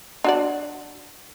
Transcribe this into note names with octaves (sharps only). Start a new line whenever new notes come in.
D4 F#4 D5